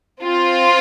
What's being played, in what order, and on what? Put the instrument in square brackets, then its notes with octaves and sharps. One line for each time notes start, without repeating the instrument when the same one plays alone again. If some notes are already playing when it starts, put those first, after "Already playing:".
[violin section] C4 F4